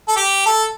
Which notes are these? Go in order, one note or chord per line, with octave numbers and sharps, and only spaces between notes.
A4
G4
A4